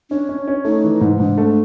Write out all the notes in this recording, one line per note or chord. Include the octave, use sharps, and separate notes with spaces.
C#4 D4
C#4
C#4
A3 D#4
E3
G#2
G#2 D4
A3